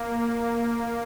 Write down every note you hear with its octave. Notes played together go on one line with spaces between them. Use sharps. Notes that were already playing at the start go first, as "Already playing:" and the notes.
Already playing: A#3